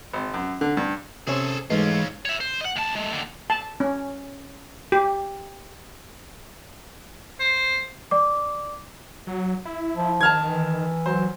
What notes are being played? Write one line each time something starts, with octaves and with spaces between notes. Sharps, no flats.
G#1
F#2
D3
G2
C3 C#4 G#4 A4 C5
G#2 E3 G#3 A3 C#4 F4
C#5 E5
C5
D#5 F#5
D#2 A5
G#3 A3
D#2 D3
A5
C#4
G4
C5
D5 D6
F#3
E4
F3
D#3 A5 F6 G#6
E3
F#3 C5